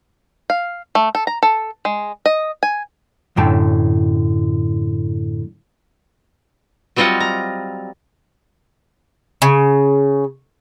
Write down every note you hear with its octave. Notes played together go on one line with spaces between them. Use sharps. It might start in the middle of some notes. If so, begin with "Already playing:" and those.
F5
A3
A4
A#5
A4
G#3
D#5
G#5
F#2 A2 D3 G5 A5
F#3 G3 C4 F4 D#5 F#5
A#5
C#3